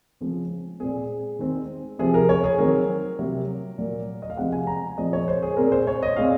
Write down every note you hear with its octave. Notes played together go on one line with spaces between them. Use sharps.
C#3 F3 G#3 C4
A#2 G#3 C4 G#4
D#3 G#3 C4
C3 F3 C4 G#4
A#4
C#5
G#4
D#3 F#3 C4 A#4
C3 F#3 A#3
A#2 F#3 A#3
D#5
F5
C3 F3 G#3 C4 F#5
G#5
A#5
A#2 F3 G#3 C4 D#5
C#5
C5
G#4
A#2 G#3 C4 A#4
C5
C#5
D#5
A#2 G#3 C4 F5